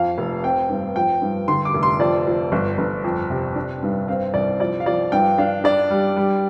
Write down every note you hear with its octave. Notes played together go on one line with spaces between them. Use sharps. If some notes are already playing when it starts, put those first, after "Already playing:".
Already playing: F2 F5
F1
C4 G5
G2
F3 G5
G2
D3 C6
D6
F1
C6
F2 D5
F3
G1
G1
F2
C3
D4
G2
C4 F5
C2 D5
F3 D5
F5
F3 D5
G2 G5
D4 F5
D4 D5
G3
G3